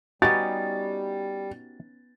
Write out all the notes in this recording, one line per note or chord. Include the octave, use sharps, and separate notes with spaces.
G3 B3 C#4 D#4 F#4 G4 A6